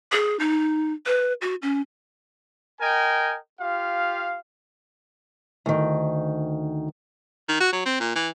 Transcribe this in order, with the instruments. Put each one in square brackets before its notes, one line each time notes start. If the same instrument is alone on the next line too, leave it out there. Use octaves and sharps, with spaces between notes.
[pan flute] G#4
D#4
B4
F#4
C#4
[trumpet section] A#4 D#5 G5 G#5
F4 G4 F5
[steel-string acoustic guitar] D2 D#3
[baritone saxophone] D#3
F#4
F#3
C4
A#2
E3